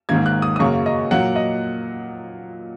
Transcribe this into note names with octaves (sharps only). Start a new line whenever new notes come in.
G#2 D#3 A#3 G#6
F#6
D#6
D#6
F#2 C#3 F#3 A#3 C#6
D#5
A#2 F#3 A#3 F#5
D#5